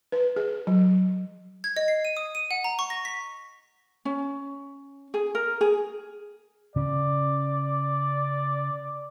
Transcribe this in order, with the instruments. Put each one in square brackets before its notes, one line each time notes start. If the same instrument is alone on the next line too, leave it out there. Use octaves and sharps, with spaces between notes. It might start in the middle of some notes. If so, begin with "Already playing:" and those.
[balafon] B4
G#4
F#3
[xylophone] G#6
D#5
C7
D#7
D#6
D#7
F#5
A#5
C#6
A#6
B6
[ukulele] C#4
G#4
A#4
G#4
[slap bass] C#3 C#4 [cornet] D5